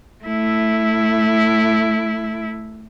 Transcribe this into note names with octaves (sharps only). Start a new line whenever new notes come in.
A3 E4